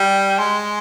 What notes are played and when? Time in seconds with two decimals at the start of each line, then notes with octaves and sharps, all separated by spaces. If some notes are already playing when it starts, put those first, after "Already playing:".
Already playing: G3
0.39 G#3